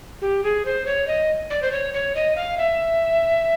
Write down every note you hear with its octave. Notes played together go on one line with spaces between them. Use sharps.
G4
G#4
C5
C#5
D#5
D5
C5
C#5
C#5
D#5
F5
E5